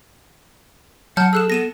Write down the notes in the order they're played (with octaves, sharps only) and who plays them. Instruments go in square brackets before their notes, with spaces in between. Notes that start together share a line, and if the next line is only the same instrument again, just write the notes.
[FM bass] F#3 [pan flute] F#5 [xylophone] A5 F6 G6
[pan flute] G#4 [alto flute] A4 [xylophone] E6 F#6 E7
[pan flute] B3 [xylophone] A#6 D#7 E7